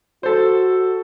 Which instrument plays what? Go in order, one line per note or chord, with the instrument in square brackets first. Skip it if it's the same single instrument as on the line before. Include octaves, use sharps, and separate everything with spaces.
[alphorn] F#4 [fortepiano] A4 C5